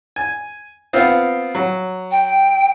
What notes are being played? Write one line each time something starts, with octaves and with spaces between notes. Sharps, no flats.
G#5
B3 C4 F4
F#3
G5